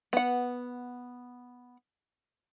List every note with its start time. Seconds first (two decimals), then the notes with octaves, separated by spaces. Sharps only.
0.13 B3 F#5